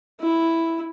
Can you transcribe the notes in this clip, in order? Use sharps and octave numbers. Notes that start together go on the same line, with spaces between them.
E4